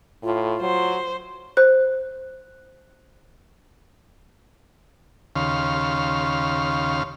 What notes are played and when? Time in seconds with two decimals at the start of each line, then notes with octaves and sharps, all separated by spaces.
0.23 A2 F4
0.61 F#3 C5
1.57 C5 F#6
5.36 D#2 C#3 F5 C6